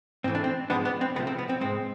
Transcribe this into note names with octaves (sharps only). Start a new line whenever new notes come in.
G#2 E3 A3 C4
D4
C4
G#2 F3 G#3 B3 D4
B3 D4
C4
C2 C3 F3 A3 B3
C4
B3
C4
G#2 G#3 C4